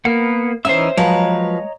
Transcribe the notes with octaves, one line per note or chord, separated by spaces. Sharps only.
A#3 B3 A#4 F#5
E3 C#4 D#4 C5 E5 E6
F3 F#3 G#3 B4 C#5 D#5 A#5